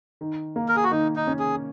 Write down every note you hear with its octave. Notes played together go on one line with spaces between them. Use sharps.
D#3
A#3
A#4
G#4
F#4
D#3 D#4
D#4
C#4
G#4